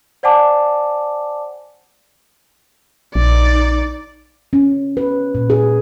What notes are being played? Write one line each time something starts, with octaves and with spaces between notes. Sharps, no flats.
C5 D5 F#5 G#5 A5 D6
A#1 D#4 D5
C#4
B4
A#2
G#4